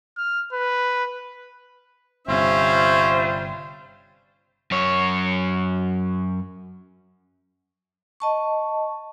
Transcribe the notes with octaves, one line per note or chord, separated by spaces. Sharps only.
F6
B4
G1 C3 G3 C#4 F4 C5 E5
F#2 C#5
D#5 A5 C#6